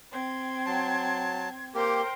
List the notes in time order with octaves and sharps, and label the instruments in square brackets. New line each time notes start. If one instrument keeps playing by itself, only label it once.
[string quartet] C4 G#6
[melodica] F#3 A5
[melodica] A#3 G4 [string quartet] A#4 C5 G5